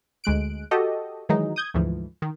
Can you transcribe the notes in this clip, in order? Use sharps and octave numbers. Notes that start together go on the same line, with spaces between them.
D2 G#3 F#6 D7
F#4 G4 A4 D#5
D#3 E3 F#3 G#3 D#4
D#6 G6 G#6
D2 G#2 E3 F3
D#3